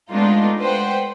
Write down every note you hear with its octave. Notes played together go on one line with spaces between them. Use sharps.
G#3 A3 B3 D4 D#4 F4
B4 C5 F#5 G5